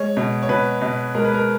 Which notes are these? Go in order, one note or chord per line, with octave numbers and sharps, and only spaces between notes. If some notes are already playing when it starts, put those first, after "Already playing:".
Already playing: G#3 C#5
B2
C#5
B2 B4
B2
G#3 A#4
B4
A#4